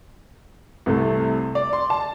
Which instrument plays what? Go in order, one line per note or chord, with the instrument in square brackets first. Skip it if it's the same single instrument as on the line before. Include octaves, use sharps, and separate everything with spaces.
[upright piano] C2 C3 A3
D5
C6
A5